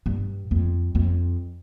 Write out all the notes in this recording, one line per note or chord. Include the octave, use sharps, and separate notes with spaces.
G2
F2
F2